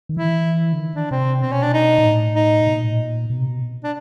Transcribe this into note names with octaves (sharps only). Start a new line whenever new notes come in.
D#3
E3 E4
D3
D#3
D4
C3 C4
B2 C4
C#4
D4
D#4
A#2
A2
D#4
B2
A#2
A2
A#2
B2
C3
B2
D4